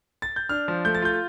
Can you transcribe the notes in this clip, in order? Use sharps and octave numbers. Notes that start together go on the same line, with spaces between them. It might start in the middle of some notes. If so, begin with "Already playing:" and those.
A6
G6
D4 F6
F3
A3 G6
A6
F4 G6